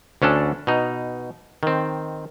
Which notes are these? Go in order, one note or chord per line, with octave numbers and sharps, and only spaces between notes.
D2 C#4 D4 A4
B2 D#4
D#3 C4